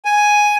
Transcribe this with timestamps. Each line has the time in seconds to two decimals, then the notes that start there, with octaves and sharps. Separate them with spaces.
0.05 G#5